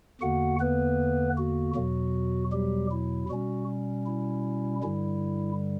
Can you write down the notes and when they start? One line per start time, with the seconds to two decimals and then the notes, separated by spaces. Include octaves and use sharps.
0.21 E2 D3 A#3 F#4 F#5
0.60 B3 B4
1.37 F#4
1.75 E2 B2 F#3 F#4
2.52 G3 G4
2.91 E4
3.29 B2 G3 C#4 F#4
4.06 E4
4.83 G2 D3 G3 E4